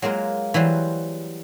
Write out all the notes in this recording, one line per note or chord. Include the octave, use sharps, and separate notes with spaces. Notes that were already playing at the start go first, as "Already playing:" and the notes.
F#3 G#3 A#3 F4
E3 F#3 G3 C5